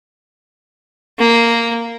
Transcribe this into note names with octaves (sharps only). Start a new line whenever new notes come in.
A#3